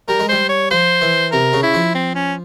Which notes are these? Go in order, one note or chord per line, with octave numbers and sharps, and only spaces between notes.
G3 A#4
G#3
G3 C5
C#5
F3 C5
E3
C3 A#4
C#3
E4
F3
C4
C#4